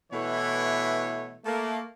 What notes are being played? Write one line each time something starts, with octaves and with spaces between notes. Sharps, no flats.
B2 E3 A3 E4 C#5
A3 A#3